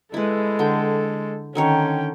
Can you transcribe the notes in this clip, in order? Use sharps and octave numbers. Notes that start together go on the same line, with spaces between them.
G#3 E4 A4 B4
D3 G5
D3 D#3 C#4 C#5 G5